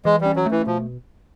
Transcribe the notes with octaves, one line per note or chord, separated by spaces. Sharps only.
E3 G#3
G3 C#4
F#3
A3
E3
B2 F3